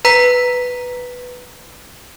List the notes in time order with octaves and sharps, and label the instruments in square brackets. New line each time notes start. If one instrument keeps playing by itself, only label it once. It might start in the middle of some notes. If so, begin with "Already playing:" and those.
[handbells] B4 A#5 B6